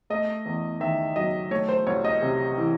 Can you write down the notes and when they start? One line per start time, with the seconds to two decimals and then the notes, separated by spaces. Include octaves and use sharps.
0.10 A3 D#5
0.46 E2
0.80 D#3 E5
1.16 F#3 D#5
1.51 A3 C#5
1.69 C5
1.87 C2 C#5
2.04 D#5
2.22 C3
2.57 E3